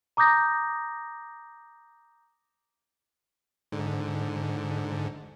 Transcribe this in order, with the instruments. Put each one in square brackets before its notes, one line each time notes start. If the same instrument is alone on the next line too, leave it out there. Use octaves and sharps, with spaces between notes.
[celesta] A#5 D6 D#6 G6 A#6
[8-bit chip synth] G#2 D3